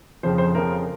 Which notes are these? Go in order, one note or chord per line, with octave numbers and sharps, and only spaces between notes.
F2 C#3 F3 C5
C5
F2 C#3 F3 A#4